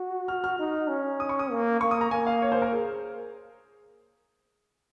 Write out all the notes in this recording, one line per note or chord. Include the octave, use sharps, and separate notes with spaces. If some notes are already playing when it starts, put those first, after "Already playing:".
Already playing: F#4
F6
F6
D#4
C#4
D#6
C#6
D#6
A#3
A#3 C#6
D#6
A#5
A#3 G#5
F5
C#5
C5
A#4
G#4